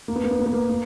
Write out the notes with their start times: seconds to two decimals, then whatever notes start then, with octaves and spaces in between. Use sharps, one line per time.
0.08 A#3
0.16 B3
0.24 A#3
0.31 B3
0.39 A#3
0.46 B3
0.53 A#3
0.69 A#3